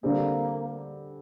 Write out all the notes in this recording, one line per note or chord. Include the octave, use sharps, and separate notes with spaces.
D3 G3 A#3 C4